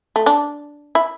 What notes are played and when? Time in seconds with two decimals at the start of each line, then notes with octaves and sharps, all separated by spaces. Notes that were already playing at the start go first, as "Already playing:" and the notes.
0.16 A3
0.26 D4
0.95 E4